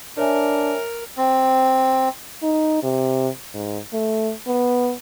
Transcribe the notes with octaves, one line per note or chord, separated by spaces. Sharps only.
D4 A#4 C#5 E5 G#5
C4
D#4
C3
G#2
A3
B3